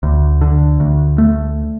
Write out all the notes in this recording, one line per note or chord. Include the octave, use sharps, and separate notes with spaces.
D2
D3
D2
A3